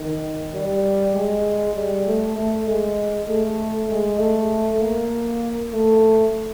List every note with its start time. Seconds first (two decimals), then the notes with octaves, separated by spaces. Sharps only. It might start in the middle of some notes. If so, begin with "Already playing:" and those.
Already playing: D#3
0.54 G3
1.14 G#3
1.74 G3
2.06 A3
2.36 A3
2.67 G#3
3.27 A3
3.89 G#3
4.18 A3
4.80 A#3
5.72 A3